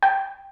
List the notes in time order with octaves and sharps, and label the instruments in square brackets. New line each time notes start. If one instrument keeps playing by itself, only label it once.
[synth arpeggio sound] G5